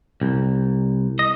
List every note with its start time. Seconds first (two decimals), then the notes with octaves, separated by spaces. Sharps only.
0.22 C2
1.19 D#5